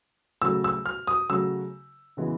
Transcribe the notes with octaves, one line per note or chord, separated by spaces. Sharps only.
C#3 F#3 A3 E6
E6
F6
D#6
C#3 F#3 A3 E6
C#3 E3 G#3 B3